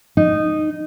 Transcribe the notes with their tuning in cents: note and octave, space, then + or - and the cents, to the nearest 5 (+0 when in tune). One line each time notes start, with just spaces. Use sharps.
D#4 -10